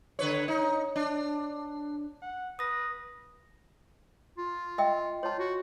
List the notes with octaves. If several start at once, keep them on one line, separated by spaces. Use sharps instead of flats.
D3 B4 C#5
D#4
D4
F#5
B4 D#6 A#6
F4
D#5 E5 G5
F4 C#5 A5
F#4